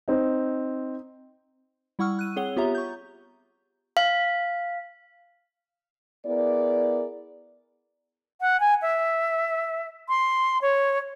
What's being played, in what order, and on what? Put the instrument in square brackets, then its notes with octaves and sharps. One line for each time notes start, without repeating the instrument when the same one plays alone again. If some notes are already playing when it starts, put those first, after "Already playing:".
[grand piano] C4 D#4
[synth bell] G3 E4 F#5 C#6 E6 F6
F#6 D#7
C4 G#4 C#5 F#5 G7
B3 F4 G4 C#5 E5 A#5
C#6 G6
[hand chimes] F5
[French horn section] B3 E4 G#4 A#4 D5
[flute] F#5
G#5
E5
C6
C#5